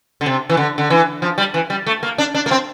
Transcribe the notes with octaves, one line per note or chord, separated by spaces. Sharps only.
D3
C3
E3
D3
D3
E3
F3
G3
E3
G3
A3
A#3
D4
D4
A#3
C4